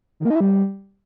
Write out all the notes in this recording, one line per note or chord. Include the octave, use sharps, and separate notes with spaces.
D#3
A#3
D#4
E4
G3